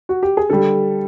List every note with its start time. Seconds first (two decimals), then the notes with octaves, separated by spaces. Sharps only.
0.09 F#4
0.23 G4
0.37 G#4
0.50 D3 G3 A4